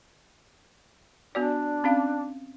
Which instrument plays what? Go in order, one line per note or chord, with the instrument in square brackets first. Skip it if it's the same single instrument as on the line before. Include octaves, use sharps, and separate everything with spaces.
[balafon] B3 F#4 D5 [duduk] D4
[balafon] C4 C#4 F5